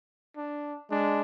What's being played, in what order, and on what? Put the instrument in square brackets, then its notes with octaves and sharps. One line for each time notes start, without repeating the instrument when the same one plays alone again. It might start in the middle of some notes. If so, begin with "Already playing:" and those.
[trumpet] D4
[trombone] G#3 [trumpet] D4